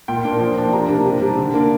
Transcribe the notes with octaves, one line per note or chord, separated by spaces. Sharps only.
A#2 G5
A#3 D4
F3
A#3 D4
C3 A#5
A#3 D4
C3
G3 D4
D3
A#3 D4